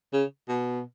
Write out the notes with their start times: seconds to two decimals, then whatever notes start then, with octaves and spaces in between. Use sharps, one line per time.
0.13 C#3
0.49 B2